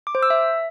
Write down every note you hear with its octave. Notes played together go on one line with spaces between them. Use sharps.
D6
C5
E6
E5